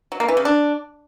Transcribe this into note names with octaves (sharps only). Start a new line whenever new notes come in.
F#3
A#3
E3
C#3
D4